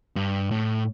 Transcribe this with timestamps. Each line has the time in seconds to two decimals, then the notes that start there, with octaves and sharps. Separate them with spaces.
0.16 G2
0.51 A2